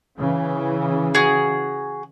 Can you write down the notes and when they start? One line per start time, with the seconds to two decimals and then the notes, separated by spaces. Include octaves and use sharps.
0.18 C#3 E3
1.15 F#4 G#4